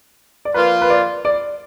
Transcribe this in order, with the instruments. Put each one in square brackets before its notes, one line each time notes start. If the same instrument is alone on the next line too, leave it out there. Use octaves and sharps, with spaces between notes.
[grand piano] D5
[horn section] F3 A#3 F4 [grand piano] B4
[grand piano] B4
D5
D5